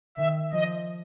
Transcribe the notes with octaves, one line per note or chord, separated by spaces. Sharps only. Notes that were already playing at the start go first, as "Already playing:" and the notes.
D#3 E5
F3 D#5